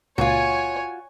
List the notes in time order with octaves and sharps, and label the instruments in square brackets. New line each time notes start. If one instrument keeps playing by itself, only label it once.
[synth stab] C#2 A#2 [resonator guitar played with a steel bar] F4 F#4 [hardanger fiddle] C#5 G#5